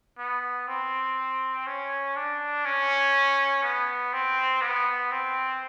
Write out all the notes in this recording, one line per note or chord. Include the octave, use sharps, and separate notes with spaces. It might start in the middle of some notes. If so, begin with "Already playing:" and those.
B3
C4
C#4
D4
C#4
B3
C4
B3
C4